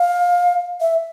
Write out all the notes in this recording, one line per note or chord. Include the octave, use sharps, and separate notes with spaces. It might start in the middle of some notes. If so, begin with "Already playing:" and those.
Already playing: F5
E5